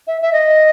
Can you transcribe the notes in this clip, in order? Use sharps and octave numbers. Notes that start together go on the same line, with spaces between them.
E5
E5
D#5